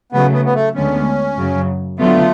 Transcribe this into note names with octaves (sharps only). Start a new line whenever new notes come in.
C#3 F#3 A3 B3
B3
B3
A3
D2 D3 G#3 B3 C#4
F#2 C#3 F#3
D3 F#3 A3 B3 F4